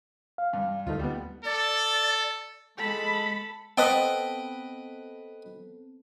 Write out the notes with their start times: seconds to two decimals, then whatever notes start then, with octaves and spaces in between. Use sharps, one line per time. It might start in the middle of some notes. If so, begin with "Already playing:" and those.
0.38 F5
0.53 G2
0.87 D2 A3 D#4 F4
1.00 G3 B3
1.45 A4 D5
2.78 G#3 A4 B5
3.78 B3 C4 A4 B4 D#5 G5